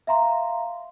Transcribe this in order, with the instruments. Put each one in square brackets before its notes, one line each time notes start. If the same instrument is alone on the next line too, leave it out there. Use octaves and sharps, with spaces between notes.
[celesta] E5 F5 A#5 C6